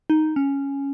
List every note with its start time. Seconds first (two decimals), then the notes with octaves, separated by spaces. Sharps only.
0.10 D#4
0.36 C#4